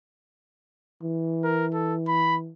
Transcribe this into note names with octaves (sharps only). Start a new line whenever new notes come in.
E3
A#4
A4
B5